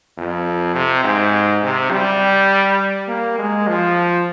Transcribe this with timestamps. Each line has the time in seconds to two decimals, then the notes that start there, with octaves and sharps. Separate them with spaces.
0.18 F2
0.75 C3
1.04 G#2
1.64 C3
1.92 G3
3.08 A#3
3.39 G#3
3.68 F3